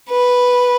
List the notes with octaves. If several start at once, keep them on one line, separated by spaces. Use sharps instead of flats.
B4